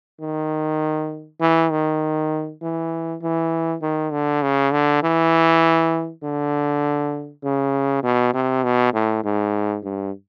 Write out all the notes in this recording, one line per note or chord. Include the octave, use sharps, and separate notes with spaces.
D#3
E3
D#3
E3
E3
D#3
D3
C#3
D3
E3
D3
C#3
B2
C3
B2
A2
G#2
G2